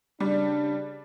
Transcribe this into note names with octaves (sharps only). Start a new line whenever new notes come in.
C#3 G3 D4 D5